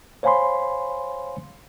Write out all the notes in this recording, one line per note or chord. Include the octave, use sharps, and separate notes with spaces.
C5 C#5 F5 G#5 B5 C6